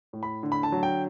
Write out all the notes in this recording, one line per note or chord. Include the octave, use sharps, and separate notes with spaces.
A2
B5
D3
B5
A5
F#3
G5